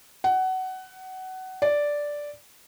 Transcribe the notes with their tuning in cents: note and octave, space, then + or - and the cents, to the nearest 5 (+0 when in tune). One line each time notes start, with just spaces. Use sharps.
F#5 +20
D5 -5